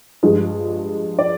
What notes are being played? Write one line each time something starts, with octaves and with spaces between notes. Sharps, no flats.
G2 F3 G#3
D5